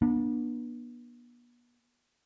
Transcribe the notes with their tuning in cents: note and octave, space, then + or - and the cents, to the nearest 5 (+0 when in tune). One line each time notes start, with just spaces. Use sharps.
B3 -35 D4 +25